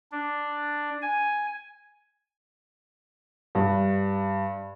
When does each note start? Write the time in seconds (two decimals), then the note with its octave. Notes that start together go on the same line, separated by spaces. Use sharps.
0.12 D4
1.02 G#5
3.55 G2